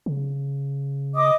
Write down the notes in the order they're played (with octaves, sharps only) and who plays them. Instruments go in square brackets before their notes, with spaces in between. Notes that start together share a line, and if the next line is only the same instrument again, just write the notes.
[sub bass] C#3
[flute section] D#5 D6 D#6